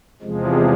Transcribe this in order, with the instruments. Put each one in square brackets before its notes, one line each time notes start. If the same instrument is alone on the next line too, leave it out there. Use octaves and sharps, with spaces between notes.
[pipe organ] E2 C3 F3 G#3